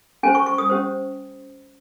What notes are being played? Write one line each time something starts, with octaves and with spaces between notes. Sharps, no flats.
C#4 G4 C5 G#5
C#6
C#6
D#6
C#4 G4 C5